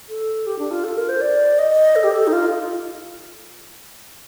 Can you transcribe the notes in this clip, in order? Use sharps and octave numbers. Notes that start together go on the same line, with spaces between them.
A4
G4
D4
F4
A4
A#4
C5
D5
D#5
A4
G4
A4
D#4
F4